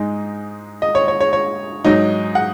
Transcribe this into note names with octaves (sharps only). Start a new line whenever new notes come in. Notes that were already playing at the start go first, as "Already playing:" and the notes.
Already playing: G#2 G#3 D#4
D#5
C#5
C#5
C#5
C#5
G#2 F#3 D#4
F#5